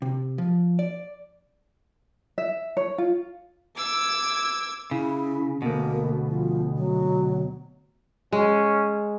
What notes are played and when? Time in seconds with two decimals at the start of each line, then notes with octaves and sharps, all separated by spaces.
0.02 C3
0.38 F3
0.79 D5
2.38 E5
2.77 C#5
2.98 F4
3.77 D6 E6 G#6
4.91 C#3 E4
5.62 D2 B2 A#3
6.28 F3
6.77 F#3
8.32 G#3 C#4